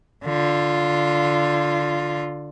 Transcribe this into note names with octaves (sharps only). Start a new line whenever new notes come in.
D3 F4